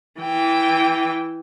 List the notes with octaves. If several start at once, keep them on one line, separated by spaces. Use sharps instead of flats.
E3 G5